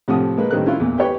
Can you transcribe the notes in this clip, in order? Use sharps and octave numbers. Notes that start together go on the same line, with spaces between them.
A2 C3 F3 F#5 D#6
G#3 A#3 B4
A2 D#3 G3 C4 A#4 F#6
C#4 E4 F4
E2 A#2
G4 B4 C#5 G5